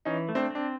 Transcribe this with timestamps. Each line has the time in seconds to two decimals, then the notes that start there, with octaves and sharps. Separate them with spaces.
0.05 E3 C#4 D#4
0.29 A3
0.35 C4 D4
0.50 C4 D4